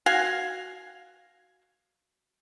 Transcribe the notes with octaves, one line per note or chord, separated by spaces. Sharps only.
F#4 F5 G#5